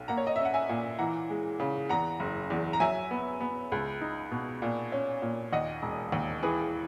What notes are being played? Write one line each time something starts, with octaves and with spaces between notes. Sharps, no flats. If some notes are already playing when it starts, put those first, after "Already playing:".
Already playing: B1
A#3 F#5 A#5
C#5
D#5
C#4 E5
F#5
E5 G#5
A#2
E3 F#5 A#5
G#3
C#3
E2 F#5 A#5
F#1
E2
A#5
F#3 E5 G#5
B3
B3
C#2
D#4
B2
A#2
C#4
A#2
D#2 D#5 F#5
E1
D#2
E3 G#4 B4